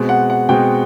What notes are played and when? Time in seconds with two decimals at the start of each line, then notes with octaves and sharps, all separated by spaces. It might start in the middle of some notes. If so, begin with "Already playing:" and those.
Already playing: B2 G#3 C4
0.09 F#5
0.30 F#5
0.49 B2 G#3 C4 G5